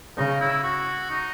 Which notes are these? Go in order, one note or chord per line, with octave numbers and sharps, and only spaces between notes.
C#3 D#4
E4
F#4
D#4